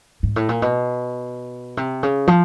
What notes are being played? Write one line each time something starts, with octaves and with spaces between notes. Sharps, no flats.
G#2
A2
A#2
B2
C3
C#3
F3